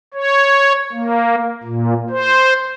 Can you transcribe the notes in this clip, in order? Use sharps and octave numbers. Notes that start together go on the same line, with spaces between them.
C#5
A#3
A#2
C5